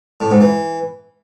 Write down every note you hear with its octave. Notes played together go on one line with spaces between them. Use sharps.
A2
G#2
E3